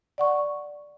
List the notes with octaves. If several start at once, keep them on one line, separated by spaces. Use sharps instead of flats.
D5 F#5 C#6